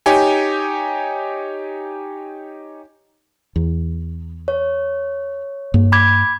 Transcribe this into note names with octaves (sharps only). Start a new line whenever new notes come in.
D#4 G4 C#5 G#5
E2
C#5
G2 A#3
B5 D6 G#6